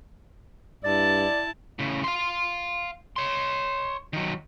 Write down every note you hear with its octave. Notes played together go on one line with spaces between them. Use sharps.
G2 E4 D5 A5
A2 C#3
F5 C6
C#5 C6
D#3 F#3